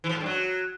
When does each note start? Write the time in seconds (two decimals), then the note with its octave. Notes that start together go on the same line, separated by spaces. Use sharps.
0.04 E3
0.09 F3
0.15 A2
0.20 G2
0.26 F#3